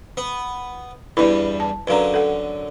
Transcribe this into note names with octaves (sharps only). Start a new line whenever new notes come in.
B3
E2 G2 E4 B4 B5
A5
F#2 D3 B4 F5 A#5
A4 F#5